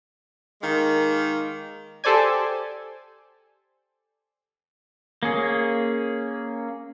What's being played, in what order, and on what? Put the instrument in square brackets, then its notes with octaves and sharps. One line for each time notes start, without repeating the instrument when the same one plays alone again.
[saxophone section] D#3 G#3 A#3
[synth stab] G4 A4 C5 D5 G#5
[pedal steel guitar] A#3 C#4 G#4